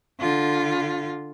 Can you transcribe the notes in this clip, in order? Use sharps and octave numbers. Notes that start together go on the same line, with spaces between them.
D3 F4